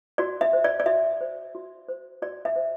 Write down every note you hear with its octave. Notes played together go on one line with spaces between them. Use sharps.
F#4 D5
E5
C5
D5
D5
F#4 E5
C5
F#4
C5
F#4 D5
E5
C5